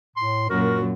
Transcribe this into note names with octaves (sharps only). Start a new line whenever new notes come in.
A2 C6
F#2 A#2 F#4 A#4